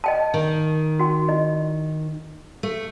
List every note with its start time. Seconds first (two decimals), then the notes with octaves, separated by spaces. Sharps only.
0.04 D#5 G5 A5
0.34 D#3
0.99 F#4 G5
1.29 E4 D#5
2.63 A3